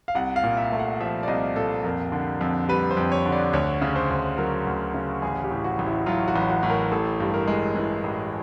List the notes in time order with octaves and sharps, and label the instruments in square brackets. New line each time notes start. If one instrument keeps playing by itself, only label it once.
[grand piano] F5
C2 F#5
F5
A#2
E5
A3
F#5
F3 E5
D5
C2 D#5
A#2 A4
F2 A#4
D3
F2
G3 B4
C5
F2
C#5
D3
D5
D2 C#5
C#3
C5
D2
F#3 A#4
D2
C#3
A1 G#4
G4
A2
F#4
A1
E4
F#3 F4
F#4
A1
F#4
A2
A#4
A1 A4
G2
A#4
G#3
E3
A1